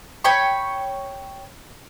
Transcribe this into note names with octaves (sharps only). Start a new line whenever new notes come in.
C#5 G5 B5 C#6